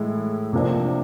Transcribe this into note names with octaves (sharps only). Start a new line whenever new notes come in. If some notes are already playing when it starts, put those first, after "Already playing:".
Already playing: A2 E3 G#3 E4
C3 F3 A#3 D4